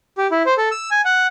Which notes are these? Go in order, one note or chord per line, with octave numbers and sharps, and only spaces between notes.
G4
E4
C5
A4
E6
G#5
F#5